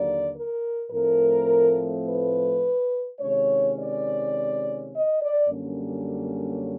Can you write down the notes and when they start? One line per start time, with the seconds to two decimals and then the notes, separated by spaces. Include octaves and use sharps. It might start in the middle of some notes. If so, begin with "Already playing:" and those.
Already playing: D#2 D3 F#3 A#3 D5
0.33 A#4
0.91 A2 F3 A3 C4 A#4
2.05 B4
3.20 C3 D#3 G#3 C#4 C#5
3.77 D5
4.92 D#5
5.21 D5
5.49 F#2 D3 G3 A#3 C#4